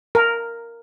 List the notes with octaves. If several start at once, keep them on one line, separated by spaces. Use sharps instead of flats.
A#4